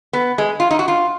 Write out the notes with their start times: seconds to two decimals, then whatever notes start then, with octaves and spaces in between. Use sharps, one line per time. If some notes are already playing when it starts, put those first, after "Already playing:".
0.13 B3
0.38 G#3
0.60 F4
0.71 D#4
0.79 F#4
0.88 F4